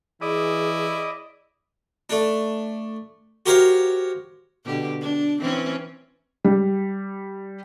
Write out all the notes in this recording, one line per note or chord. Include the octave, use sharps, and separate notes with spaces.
E3 E4 G#4 D5 D#5
A3 D4
F#4 G4 A#4 C5 C#5 F5
B2 D3 G4
D4
E3 C4 C#4
G3